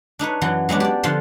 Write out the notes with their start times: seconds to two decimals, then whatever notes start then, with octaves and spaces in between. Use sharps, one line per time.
0.19 D4 D#4 B4 C#5
0.41 F#2 E3 F#3 F#5
0.69 F#3 G#3 B3 D4
0.80 G4 D5
1.03 D3 F3 F4 F5 F#5 A5